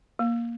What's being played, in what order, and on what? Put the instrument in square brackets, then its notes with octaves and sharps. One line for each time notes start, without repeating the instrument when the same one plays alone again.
[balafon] A#3